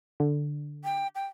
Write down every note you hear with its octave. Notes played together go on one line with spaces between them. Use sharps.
D3
G5
G5